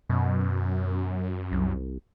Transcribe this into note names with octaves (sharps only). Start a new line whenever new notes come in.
F#2 B2
C2